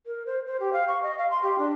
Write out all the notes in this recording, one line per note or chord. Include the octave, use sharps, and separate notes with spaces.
A#4
C5
C5
G4
F5
C#6
D#5
F5
C6
G4
D4